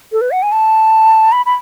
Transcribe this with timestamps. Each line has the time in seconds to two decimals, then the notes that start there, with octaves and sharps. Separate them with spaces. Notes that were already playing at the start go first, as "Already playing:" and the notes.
0.12 A4
0.21 B4
0.31 F#5
0.43 G#5
0.52 A5
1.32 B5
1.46 B5